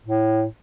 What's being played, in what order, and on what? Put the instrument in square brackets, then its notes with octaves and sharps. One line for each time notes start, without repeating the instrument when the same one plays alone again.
[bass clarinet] A2